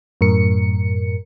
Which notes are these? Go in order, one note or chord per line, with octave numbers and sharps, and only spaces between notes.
F#2 A2 A#4 C#7